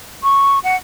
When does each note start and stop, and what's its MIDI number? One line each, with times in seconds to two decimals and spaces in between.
0.23 0.59 85
0.64 0.76 78